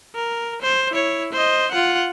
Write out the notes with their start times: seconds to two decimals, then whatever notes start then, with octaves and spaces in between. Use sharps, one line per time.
0.15 A#4
0.62 C5
0.92 E4 C#5
1.32 C5 D#5
1.71 F4 F#5